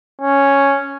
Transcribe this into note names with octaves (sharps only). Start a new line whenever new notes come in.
C#4